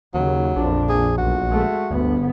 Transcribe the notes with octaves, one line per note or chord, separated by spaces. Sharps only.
D#2 C#3 F#3
A#1 F2 D4
G#4
B1 F#4
G#3 A3
G1 D2 B3